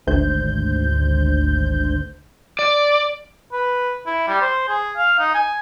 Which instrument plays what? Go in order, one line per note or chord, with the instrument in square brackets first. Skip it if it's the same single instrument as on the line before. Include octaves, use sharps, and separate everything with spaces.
[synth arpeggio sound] G#1 D2 C5 G6
[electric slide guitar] D5
[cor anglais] B4
E4
G3
C5
G#4
F5
D#4
G#5